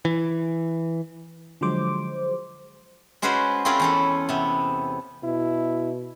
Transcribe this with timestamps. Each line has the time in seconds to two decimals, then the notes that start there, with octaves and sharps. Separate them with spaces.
0.05 E3
1.61 D3 F3 F#3 G#3 C5 D6
3.22 G#3 C#4 F#4 G#4 B4 C5
3.65 C4 C#4 F4 G#4 A#4 B4
3.79 E2 C#4 A4
4.29 C3 B3
5.24 B2 E4